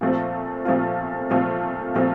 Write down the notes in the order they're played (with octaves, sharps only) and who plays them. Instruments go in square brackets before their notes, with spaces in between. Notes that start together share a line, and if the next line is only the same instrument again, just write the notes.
[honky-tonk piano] A#2 F3 A3 C4 F4
A#2 F3 A3 C4 F4
A#2 F3 A3 C4 F4
A#2 F3 A3 C4 F4